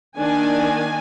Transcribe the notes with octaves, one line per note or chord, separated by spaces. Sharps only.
D#3 A#3 D4 G#5